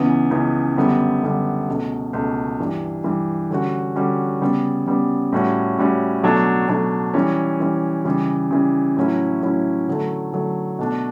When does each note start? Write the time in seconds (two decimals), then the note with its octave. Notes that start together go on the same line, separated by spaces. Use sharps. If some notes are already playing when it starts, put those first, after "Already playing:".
Already playing: C#2 C#3 E3 B3
0.31 C#2 C#3 E3 B3
0.76 F#2 D3 G3 B3
1.23 F#2 D3 G3 B3
1.68 C#2 B2 A3
2.13 C#2 B2 A3
2.59 G2 E3 G3
3.04 G2 E3 G3
3.50 D3 G3 C#4 F#4
3.96 D3 G3 C#4 F#4
4.42 C#3 G3 B3
4.87 C#3 G3 B3
5.32 A2 G3 C#4 F#4
5.78 A2 G3 C#4 F#4
6.23 B2 F#3 A3 D4
6.68 B2 F#3 A3 D4
7.14 E3 G3 C#4
7.60 E3 G3 C#4
8.05 C#3 E3 G3
8.51 C#3 E3 G3
8.97 A2 F#3 C#4 E4
9.42 A2 F#3 C#4 E4
9.88 D3 F#3 A3
10.33 D3 F#3 A3
10.79 B2 A3 D4